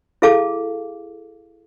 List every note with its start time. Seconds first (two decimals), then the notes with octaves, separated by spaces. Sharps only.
0.22 E4 G#4 A4 F5 A5 D6